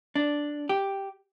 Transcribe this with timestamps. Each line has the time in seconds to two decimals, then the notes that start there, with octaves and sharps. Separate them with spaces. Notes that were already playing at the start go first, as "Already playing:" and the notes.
0.15 D4
0.69 G4